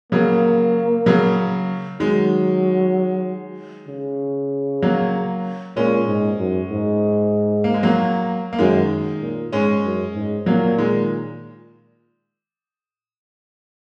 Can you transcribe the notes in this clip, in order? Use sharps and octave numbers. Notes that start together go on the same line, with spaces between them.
C#3 F#3 A#3
C#3 F#3
D#3 F#3 G#3
C#3
F#3 A#3
A#2 G#3 C#4
G#2
F#2
G#2
A#3
G#3
F#3 A#3
A#3
F#2 D#3 G#3
A#2
G#2 G#3 C#4
F#2
G#2
A#2 F#3 A#3
D#3 G#3